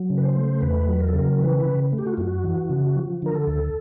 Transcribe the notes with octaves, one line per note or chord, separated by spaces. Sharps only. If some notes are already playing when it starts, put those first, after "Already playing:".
Already playing: F#3
C#3
B4
C5
A3
E2 B4
F#3
A#4
A4
C#3 A#4
E3 B4
B4
C#3
A3
G4
F#4
F4
F#2 F#4
E3
C#3
F3
D3 A#4
A4
D2